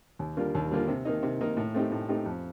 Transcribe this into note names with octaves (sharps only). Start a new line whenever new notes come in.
D#2
D3 G3 A#3 F4
D#2
D3 G3 A#3 F4
C3
D#3 A#3 D#4
C3
D#3 A#3 D#4
A2
A3 C4 D#4 G4
A2
A3 C4 D#4 G4
F2